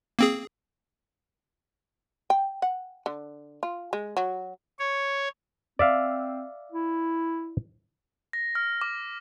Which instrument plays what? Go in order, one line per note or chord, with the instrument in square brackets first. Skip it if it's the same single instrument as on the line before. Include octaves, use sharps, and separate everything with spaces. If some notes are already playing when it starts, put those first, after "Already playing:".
[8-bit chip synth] A#3 C4 G#4
[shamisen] G5
F#5
D3
F4
G#3
F#3
[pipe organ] C#5
[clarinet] C4 [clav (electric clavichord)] D5 E5 F5
[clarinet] E4
[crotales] A#6
F6
D6